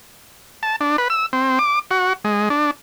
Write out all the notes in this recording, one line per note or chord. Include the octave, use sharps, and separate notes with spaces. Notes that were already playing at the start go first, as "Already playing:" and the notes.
A5
D4
B4
E6
C4
D6
F#4
G#3
D4